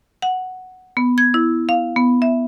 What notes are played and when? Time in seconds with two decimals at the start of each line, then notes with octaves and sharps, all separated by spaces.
0.22 F#5
0.97 B3
1.18 G#6
1.34 E4
1.69 F5
1.96 B3
2.22 E5